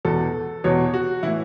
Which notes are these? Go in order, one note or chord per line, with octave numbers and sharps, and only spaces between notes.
E2 B2 A4
E2 B2 C#5
F#4
A2 E3 E4